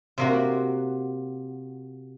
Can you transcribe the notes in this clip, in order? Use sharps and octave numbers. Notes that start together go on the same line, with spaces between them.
C3 A#3 F#4